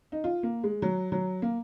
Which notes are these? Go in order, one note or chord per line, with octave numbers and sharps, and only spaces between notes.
D#4
F4
A#3
G#3
F#3
F#3
A#3